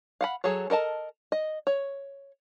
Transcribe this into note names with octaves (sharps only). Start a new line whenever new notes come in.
F5 F#5 B5
F#3 G#4 A4 C#5
A4 A#4 D#5 A5
D#5
C#5